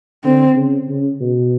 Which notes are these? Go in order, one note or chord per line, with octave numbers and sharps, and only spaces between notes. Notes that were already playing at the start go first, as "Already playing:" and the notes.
D3 C4
C#3
C#3
B2